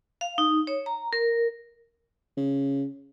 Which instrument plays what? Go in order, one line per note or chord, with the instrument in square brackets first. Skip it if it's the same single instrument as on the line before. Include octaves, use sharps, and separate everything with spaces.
[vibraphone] F5
D#4
C#5
A#5
A#4
[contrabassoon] C#3